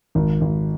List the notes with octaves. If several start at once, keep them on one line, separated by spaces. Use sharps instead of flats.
G#1
G#1